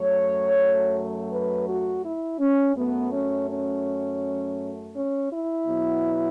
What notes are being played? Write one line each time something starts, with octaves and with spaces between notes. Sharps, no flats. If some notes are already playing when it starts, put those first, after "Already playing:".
Already playing: F#2 F#3 A3 C#5
B4
F#4
E4
C#4
F#2 F#3 A3 B3
C#4
C#4
C#4
E4
B2 F#3 B3